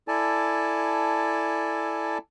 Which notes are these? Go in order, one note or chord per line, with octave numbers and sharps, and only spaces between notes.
E4 A4 D5 G#5 A5